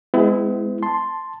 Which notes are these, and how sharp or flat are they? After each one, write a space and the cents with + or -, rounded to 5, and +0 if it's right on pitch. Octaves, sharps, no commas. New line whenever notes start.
G#3 +0 B3 +45 E4 +0
A5 +0 C6 +0